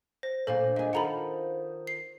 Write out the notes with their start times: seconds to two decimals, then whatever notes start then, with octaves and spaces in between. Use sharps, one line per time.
0.23 C5 A#6
0.47 D2 A#2 A4 C5 F5
0.76 A#2 G#4 D#5
0.93 D#3 F4 A4 F#5 A#5 B5
1.87 C7